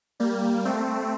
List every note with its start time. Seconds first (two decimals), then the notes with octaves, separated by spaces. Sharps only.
0.20 G3 A#3
0.65 A3 C4